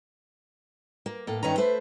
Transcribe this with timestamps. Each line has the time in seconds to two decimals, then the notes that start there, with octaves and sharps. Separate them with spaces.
1.06 A#3
1.27 A2 A#3 A4
1.43 G2 D#3 C#4 B4 A#5
1.57 A3 B4 C5 E5